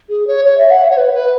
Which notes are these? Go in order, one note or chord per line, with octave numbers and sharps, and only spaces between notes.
G#4
C#5
C#5
E5
F#5
E5
C#5
B4
B4